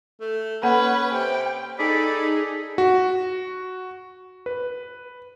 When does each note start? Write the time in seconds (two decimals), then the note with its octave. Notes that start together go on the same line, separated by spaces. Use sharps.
0.20 A3
0.63 A#3 C#4 A4 B4 F#5
1.11 C3 G5
1.79 D#4 G#4 A4 D5 B5
2.78 F#4
4.46 B4